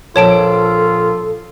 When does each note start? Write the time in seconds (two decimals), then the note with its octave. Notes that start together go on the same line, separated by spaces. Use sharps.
0.16 A#1 F4 A4 C#5 A5 D7